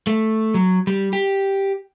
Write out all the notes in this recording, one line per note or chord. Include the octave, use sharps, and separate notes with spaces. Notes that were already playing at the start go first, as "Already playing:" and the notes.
A3
F#3
G3
G4